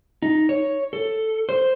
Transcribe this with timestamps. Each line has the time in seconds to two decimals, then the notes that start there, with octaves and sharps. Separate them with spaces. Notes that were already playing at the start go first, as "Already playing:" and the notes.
0.22 D#4
0.49 C#5
0.93 A4
1.49 C5